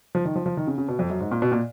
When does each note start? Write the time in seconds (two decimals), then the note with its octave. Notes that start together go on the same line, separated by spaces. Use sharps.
0.15 F3
0.25 D#3
0.36 F3
0.46 F3
0.57 D#3
0.67 C#3
0.78 C#3
0.88 B2
0.99 F2
1.10 F#2
1.20 G#2
1.31 A#2
1.42 B2
1.52 A#2